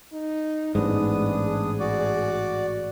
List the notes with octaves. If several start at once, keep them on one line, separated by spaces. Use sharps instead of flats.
D#4
A1 G#2 B3 D4 G#4 D#6
F#4 D5